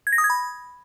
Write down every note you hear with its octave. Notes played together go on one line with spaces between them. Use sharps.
G#6
A#6
D#6
G#6
B5